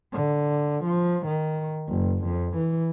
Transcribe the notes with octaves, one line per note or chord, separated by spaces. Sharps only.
D3
F3
D#3
F#1
F2
E3